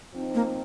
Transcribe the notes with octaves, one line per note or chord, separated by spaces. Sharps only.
F3 C4 D#4
A#3